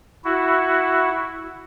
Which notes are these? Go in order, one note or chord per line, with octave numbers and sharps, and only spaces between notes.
E4 F#4